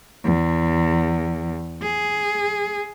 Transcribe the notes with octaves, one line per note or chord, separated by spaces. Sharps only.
E2
G#4